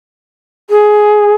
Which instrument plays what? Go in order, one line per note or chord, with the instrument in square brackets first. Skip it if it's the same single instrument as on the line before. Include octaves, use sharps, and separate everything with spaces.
[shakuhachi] G#4